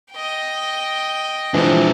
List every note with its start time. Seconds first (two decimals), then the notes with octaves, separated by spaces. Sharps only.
0.12 D#5 G5
1.54 E3 F3 G#3 D4